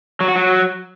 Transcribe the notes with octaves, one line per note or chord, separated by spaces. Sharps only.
F#3
F#4
F#3